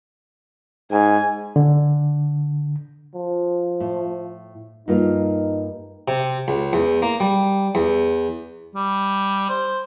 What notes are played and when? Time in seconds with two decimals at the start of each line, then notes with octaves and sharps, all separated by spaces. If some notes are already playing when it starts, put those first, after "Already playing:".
0.91 G#2 G#5
1.56 D3
3.15 F3
3.80 A2
4.88 G2 A#3 D#4 F4
6.08 C3
6.48 C#2
6.73 E2
7.02 A#3
7.20 G3
7.75 E2
8.75 G3
9.49 C5